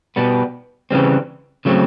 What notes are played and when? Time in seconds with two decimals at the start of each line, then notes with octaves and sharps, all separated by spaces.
0.16 B2 G3 B3
0.91 C#3 E3 G3 C4
1.65 C#3 F#3 A3 C4